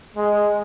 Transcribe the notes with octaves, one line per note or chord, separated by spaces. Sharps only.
G#3